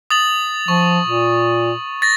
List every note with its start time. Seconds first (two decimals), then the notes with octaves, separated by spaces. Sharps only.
0.10 D#6 A6 F#7
0.68 F3 C#6
1.07 A#2
2.02 A6 A#6